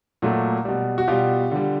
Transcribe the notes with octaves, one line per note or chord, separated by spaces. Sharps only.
A#2 F#3 A3
B2 G3
F#4
B2 G3 F4 G4
D3 G3